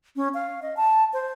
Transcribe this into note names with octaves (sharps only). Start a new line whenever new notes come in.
C#4
F5
D#5
A5
C5